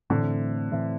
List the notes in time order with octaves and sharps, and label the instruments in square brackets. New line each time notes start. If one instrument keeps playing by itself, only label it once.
[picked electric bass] A2 E3 A3 C4 [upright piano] D3
[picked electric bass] A2 E3 A3 C4